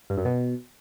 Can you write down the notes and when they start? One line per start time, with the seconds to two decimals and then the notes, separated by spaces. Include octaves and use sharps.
0.10 G2
0.18 F#2
0.25 B2